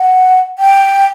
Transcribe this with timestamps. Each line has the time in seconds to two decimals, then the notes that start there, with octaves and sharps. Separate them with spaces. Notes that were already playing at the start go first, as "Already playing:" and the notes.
Already playing: F#5
0.59 G5